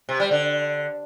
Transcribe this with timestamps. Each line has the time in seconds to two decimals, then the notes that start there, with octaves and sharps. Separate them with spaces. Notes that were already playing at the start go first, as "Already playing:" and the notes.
0.09 C3
0.20 G3
0.31 D3